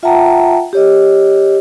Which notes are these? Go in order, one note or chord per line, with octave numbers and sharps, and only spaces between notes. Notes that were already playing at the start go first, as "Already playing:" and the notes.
F4 E5 F#5 G5 A5 A#5
G4 C#5 D#5